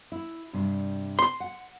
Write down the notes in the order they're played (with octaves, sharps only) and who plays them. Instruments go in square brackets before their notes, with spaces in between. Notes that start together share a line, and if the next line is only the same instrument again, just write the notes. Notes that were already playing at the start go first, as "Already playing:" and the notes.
[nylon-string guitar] E4
G2 C3
[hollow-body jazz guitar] C6
[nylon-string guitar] F#5